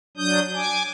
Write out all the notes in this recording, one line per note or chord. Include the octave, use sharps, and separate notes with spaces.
F#3 D4 D#6 G6
G#5 D6